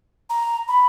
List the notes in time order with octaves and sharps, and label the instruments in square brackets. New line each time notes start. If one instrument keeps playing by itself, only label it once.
[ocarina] A#5
B5